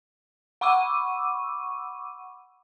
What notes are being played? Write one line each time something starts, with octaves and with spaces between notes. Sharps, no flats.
F#5 B5 C#6 D6 E6 D#7